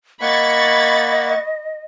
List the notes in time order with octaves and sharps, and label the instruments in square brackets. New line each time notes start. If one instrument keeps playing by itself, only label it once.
[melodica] A#3 F#5 [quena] D#5 [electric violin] B5 [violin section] C#6 G#6 A6